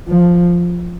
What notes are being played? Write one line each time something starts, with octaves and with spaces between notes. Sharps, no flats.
F3